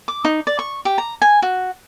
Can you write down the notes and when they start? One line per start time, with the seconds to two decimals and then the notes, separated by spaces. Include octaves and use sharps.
0.08 D6
0.25 D#4
0.47 D5
0.59 C#6
0.85 G4
0.98 A#5
1.22 G#5
1.42 F#4